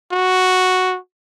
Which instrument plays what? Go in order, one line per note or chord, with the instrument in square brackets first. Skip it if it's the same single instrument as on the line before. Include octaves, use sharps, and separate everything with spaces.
[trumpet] F#4